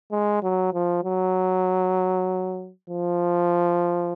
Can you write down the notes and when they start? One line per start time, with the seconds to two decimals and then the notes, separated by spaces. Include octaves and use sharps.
0.11 G#3
0.43 F#3
0.73 F3
1.04 F#3
2.90 F3